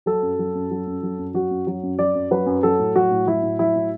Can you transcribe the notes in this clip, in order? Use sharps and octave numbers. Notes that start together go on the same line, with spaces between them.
F#3 A4
F#2
F#3
F#2
F#3
F#2
F#3
F#2
F#3 F#4
F#2
F#3
F#2
F#3 D5
F#2
F#3 B4
F#2
F#3 A4
A2
F#3 F#4
A2
F#3 E4
A2
F#3 E4
A2